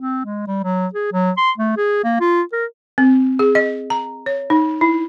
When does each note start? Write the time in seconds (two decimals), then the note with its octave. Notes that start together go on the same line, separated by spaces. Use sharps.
0.01 C4
0.25 G#3
0.47 G3
0.63 F#3
0.94 G#4
1.12 F#3
1.37 C6
1.58 A3
1.77 G#4
2.04 A#3
2.20 F4
2.53 A#4
2.98 C4
3.39 G#4
3.55 D#5
3.90 A#5
4.26 C#5
4.50 D#4
4.81 E4